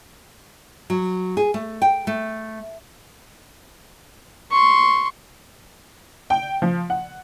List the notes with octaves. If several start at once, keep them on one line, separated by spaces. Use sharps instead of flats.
F#3
G#4
A3
G5
A3
C6 C#6
G5
F3
F#5